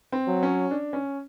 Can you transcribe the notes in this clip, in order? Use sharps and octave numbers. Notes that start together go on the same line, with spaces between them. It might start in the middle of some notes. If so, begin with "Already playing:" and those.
C4
F#3
C#4
D4
C#4